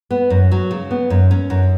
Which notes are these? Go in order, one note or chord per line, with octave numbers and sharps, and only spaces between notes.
B3
F#2
F#3
C#3
B3
F#2
C#4
F#2